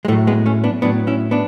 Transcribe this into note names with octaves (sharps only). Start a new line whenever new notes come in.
G#3
A2 F#3 A3
G#3 B3
A3 C#4
B3 D4
A2 F#3 B3 D4
C#4 E4
B3 D4